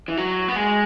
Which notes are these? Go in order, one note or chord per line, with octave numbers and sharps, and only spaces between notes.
E3
F#3
B3
G#3